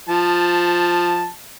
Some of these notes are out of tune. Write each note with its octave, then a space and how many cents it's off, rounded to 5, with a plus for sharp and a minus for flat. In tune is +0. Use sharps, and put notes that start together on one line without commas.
F3 +0 A5 +0